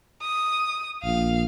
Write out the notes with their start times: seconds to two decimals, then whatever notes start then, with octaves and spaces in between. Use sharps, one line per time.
0.22 D#6
1.03 A#1 F5